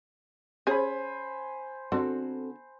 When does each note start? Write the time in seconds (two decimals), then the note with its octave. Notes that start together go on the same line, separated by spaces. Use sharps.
0.67 C#4 G#4 C5 G#5 B5
1.92 D3 C4 F#4 A4